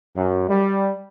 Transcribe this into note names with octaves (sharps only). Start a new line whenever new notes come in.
F#2
G3